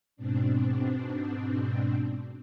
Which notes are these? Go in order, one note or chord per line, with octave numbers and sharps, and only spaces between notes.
G#2 B2 C4 D4